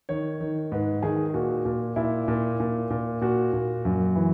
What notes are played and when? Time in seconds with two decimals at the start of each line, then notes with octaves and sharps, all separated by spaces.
0.09 D#3 C#5
0.40 D#3
0.72 G#2 B4
1.02 D#3 G#4
1.34 A#2 F#4
1.65 A#2
1.96 A#2 E4
2.28 A#2
2.60 A#2
2.90 A#2
3.21 A#2 F#4
3.53 A#2
3.85 F#2
4.15 E3